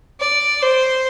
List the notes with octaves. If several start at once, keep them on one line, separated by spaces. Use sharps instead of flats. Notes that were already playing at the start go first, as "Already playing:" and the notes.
D5
C5